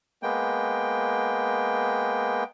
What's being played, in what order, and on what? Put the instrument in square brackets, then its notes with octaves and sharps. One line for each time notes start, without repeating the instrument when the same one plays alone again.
[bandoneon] G#3 A#3 B3 G5